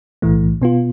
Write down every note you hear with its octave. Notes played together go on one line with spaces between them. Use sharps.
B1 A2 E3 A3
B2 B3 F4